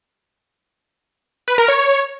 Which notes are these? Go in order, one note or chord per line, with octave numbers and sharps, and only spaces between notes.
B4
A#4
C#5